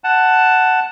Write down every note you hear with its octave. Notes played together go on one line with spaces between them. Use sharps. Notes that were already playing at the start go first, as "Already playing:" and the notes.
F#5 A5